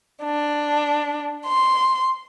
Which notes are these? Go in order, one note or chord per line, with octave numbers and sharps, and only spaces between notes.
D4
C6